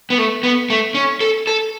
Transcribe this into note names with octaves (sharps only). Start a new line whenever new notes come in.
B3
A3
B3
A3
C#4
A4
A4